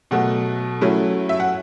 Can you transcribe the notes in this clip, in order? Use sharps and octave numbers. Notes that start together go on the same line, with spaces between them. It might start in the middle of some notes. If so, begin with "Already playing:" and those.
B2 F#3 A3 F#5
F#3 A3 C#4 E4
E5
F#5